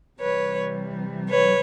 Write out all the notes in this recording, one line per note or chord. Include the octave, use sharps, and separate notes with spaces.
C3 E3 G3 B4 C#5
B4 C#5